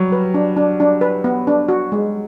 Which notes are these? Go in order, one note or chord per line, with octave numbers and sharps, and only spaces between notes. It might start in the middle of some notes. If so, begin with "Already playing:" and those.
Already playing: F#3 G3
B4
D4
D4
D4
B4
B3
D4
F#4
G#3